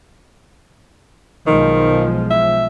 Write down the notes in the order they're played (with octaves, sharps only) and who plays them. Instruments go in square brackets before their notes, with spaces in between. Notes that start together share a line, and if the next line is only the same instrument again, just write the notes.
[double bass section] B1 F3 G#3 [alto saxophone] D#3
[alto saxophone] E5